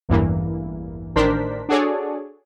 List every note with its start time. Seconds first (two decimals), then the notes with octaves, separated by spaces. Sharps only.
0.09 A1 E2 G2 E3 A#3
1.16 A1 D#3 D4 A#4 C5 B6
1.69 D4 F#4 G#4 A4 C#5 D5